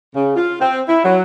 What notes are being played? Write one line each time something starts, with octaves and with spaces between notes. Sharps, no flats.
C#3
F4
C4
E4
F#3